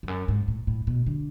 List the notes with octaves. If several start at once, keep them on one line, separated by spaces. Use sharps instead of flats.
F2
F#2
G#2
A2
A2
B2
D3